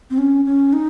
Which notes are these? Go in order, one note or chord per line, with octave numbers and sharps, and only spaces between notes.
C4
C#4
C#4
D#4